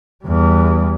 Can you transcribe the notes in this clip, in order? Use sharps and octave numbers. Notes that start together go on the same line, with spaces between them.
E2 G3